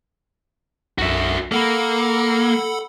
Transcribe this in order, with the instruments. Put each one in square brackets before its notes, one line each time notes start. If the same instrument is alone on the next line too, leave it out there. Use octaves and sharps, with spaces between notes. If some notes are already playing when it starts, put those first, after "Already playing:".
[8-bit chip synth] B1 F#2 [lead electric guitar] F#4 E5
[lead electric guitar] A#3 [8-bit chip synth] A4 F#5 B5